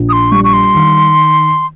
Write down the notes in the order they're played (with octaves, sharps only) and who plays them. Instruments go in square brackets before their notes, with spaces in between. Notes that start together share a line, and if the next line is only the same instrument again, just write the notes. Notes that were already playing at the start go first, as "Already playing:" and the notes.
Already playing: [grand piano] A#1
[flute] D#6
C6
[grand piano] G3 [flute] C#6
[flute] C#6
C6
[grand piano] D#3